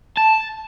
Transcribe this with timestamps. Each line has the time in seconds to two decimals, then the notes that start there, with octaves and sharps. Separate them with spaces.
0.17 A5